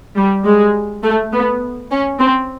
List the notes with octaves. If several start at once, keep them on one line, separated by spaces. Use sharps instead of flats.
G3
G#3
A3
B3
C#4
C4